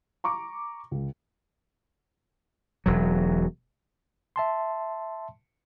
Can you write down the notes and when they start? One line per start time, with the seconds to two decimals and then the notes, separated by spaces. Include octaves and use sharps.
0.24 A#5 C#6 D6
0.91 C#2
2.86 E1 F#3
4.36 E5 A5 C6